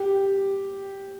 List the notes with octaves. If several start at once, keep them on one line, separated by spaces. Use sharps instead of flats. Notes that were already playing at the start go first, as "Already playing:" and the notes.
Already playing: G4